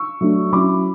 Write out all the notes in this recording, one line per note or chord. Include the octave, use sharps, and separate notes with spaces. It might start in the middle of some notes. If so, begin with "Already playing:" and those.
Already playing: C#6 E6
F#3 A3 D4
F#3 C#4 E4 B5 D6